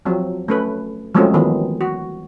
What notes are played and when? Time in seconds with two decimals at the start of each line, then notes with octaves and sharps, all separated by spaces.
0.06 F3 F#3 C4
0.48 A3 C#4 B4
1.15 F3 F#3 G#3 A3 C4 C#4
1.34 D#3 E3 F#3 B3
1.81 F#4